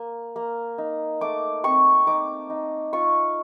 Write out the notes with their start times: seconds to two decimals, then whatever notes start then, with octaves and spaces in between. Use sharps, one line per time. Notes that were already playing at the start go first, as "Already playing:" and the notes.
Already playing: A#3
0.36 A#3
0.78 D#4
1.21 A3 D6
1.64 C4 C#6
2.07 D#4 D6
2.50 D#4
2.93 F4 C#6